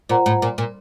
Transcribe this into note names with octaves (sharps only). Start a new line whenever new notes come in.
A#2 F4 C5 F#5 A#5
A2
A#2
A#2